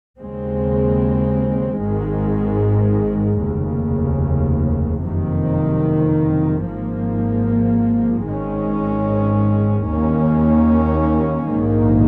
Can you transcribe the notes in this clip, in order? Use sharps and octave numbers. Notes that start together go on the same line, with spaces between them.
D#2 C#3 G#3 C4
G#1 G#2 D#3 G#3
F1 D#2 C#3
F#1 F2 C3 D#3
G#1 G#2 F3 A#3
G#1 G#2 D#3 G#3 C#4
D#2 D#3 A#3 C#4
A#1 G#2 D#3 A#3